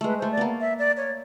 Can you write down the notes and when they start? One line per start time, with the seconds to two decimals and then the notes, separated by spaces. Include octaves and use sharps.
0.01 G#3 A3 B4
0.18 A3 C5
0.32 D5
0.37 A#3 B3
0.61 E5
0.79 D5
0.97 C#5